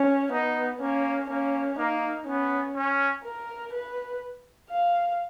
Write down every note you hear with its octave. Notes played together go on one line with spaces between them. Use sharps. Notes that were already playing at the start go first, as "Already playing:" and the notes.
Already playing: C#4
B3 D#4
A#3 C#4
A#3 C#4
A#3 D#4
B3 C#4
C#4
A#4
B4
F5